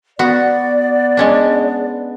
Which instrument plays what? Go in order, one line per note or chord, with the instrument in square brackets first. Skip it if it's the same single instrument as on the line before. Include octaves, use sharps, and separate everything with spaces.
[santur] B3 [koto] F#4 [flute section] D5
[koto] G#3 C#4 D4